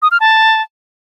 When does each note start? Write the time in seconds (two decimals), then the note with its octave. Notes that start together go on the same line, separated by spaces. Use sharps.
0.02 D#6
0.11 F6
0.20 A5